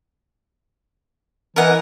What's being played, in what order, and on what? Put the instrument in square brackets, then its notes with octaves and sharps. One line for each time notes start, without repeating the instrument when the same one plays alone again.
[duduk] E3 [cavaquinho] A#4 D#5 F#5